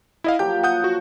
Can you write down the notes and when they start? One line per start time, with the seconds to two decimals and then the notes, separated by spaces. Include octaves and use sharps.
0.24 E4 D#5 F5
0.39 F3 F#3 A#3 G4 G5 G6
0.63 F#5 D#6 G6
0.84 F#4